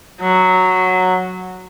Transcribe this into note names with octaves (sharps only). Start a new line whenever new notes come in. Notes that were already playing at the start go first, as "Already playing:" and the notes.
F#3